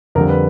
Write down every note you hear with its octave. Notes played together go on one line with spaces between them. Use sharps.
F2 D3 G3 A#4
B4